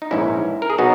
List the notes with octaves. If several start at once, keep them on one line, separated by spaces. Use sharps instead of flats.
D#4
A#1 G#2 E3 C#4 E4
A#4
G#4
B2 F#3 B3 D#4 F#4